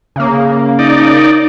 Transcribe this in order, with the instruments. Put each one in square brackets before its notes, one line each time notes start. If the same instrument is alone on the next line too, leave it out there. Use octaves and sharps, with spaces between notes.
[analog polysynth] C#3 A#3
[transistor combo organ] D#4 D5